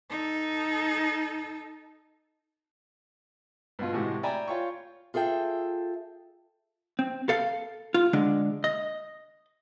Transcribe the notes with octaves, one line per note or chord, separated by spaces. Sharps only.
D#4 A4
G2 B2 F4
A2 C3 E3 G#3 F#4 G4
D5 E5 G5 G#5 A#5 B5
F4 C#5 G5 C#6
F4 G#4 A4 E5 G5
C4
A4 F5
F4
D3 G#3 D4
D#5